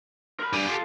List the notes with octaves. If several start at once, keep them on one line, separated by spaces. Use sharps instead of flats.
A#4 B5
G2 G4 G#5
F4 A4